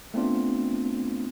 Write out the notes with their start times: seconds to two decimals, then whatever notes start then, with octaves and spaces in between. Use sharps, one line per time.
0.14 A3 B3 C4 D4 F4